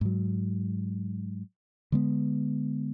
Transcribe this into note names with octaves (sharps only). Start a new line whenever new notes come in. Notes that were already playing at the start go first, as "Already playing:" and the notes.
G#2 F#3
D3 G#3 B3